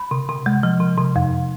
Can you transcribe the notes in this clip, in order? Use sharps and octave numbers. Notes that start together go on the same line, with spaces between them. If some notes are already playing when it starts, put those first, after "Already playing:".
Already playing: B5
C3
C3
G#3
F3
C3
C3
F2